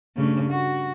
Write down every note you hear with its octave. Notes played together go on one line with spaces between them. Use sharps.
G2 C#3 A3
F#4